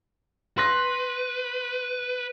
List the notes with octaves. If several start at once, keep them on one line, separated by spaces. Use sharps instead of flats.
B4 C6 F#6 A#6